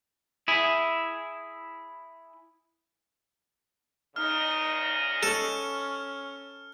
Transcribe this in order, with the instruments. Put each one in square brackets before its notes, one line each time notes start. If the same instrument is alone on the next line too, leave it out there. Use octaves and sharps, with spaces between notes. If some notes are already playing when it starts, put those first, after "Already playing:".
[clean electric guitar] E4 G#4
[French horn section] E2 C#3 D#5 [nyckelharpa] D#4 [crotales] F6
[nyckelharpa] C#4 [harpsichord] A4